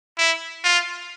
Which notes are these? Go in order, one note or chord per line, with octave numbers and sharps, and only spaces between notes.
E4
F4